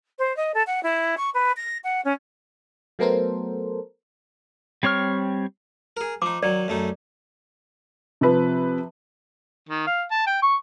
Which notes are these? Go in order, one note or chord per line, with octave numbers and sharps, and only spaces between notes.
C5
D#5
A4
F#5
E4
C#6
B4
A#6
F#5
C#4
F#3 A3 B3 A4 A#4 C5
G3 C4 C#5 C#6 F6
G#4 A#4
F3 D#4 D6
D#3 F#3 D5
F#2 A3 D#4
C3 F3 B4
D#3
F5
A5
G5
C#6